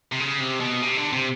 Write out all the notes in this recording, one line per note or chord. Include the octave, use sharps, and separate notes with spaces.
C3
C#3
C3
B2
C3
D3
C3